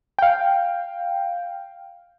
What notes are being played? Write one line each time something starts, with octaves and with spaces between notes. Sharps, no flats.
F5 G5